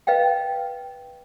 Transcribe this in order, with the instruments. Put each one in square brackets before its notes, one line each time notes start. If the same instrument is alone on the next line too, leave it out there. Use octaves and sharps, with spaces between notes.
[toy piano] B4 D#5 F5 G5